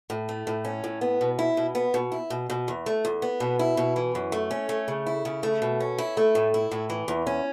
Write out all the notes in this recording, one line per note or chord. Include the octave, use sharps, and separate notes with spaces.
A2
A3
A2
C#4
A2
B3
B2
E4
B2
B3
B2
E4
B2
B2
E2
A3
E2
B3
B2
E4
B2
E3
F#2
A3
C#4
A3
C#3
E4
C#3
A3
B2
C#4
E4
A3
A2
E4
A2
E3
E2
C#4